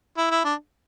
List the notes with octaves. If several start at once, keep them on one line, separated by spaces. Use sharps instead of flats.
E4
E4
D4